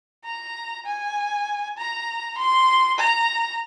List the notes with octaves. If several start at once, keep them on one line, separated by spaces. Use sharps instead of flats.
A#5
G#5
A#5
C6
A#5